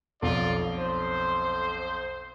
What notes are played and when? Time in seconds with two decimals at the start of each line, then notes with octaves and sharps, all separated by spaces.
0.22 B1 F2 F4 D5
0.76 C5